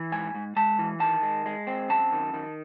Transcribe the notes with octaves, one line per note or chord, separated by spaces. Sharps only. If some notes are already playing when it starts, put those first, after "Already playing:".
Already playing: E3
G#2 G#5
G#2
G#3 A5
E3
D#3 A5
G#3
G#3
C4
F#2 A5
D#3
D#3